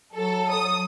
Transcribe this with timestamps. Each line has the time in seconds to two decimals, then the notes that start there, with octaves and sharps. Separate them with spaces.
0.14 F#3 A4
0.50 D#6